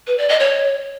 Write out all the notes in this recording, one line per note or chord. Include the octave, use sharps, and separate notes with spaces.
B4
D5
D#5
C#5